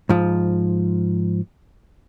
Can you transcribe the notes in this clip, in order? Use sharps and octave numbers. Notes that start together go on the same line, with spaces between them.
G#2 F3